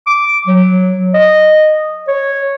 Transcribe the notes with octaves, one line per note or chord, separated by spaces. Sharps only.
D6
F#3
D#5
C#5